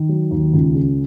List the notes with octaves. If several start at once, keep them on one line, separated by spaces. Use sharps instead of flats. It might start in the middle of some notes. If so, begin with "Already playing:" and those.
Already playing: D#3
F#3
D#2
C#2
C#3